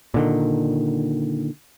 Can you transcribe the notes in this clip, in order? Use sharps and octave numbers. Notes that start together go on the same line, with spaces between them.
A#2 D3 D#3